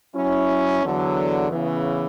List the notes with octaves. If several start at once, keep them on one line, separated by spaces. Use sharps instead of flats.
F#3 C#4 E4
E2 D3 F#3
C#3 E3 B3